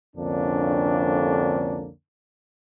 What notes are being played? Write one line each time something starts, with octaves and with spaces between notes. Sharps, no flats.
C2 F2 D3 A#3 C#4 D4